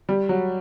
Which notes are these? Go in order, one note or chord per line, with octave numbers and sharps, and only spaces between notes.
G3
F#3